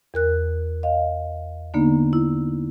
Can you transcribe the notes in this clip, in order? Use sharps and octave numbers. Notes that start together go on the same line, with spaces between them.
E2 A#4 F#6
D#5 F5
D3 A#3 B3 D4 D#4
E4